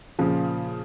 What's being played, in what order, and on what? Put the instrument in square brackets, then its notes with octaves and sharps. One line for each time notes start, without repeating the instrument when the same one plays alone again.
[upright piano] A#2 C#3 F3